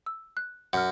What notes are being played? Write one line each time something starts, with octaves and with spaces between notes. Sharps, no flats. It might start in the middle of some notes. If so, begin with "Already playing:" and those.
E6
F#6
F#2 F#5 F6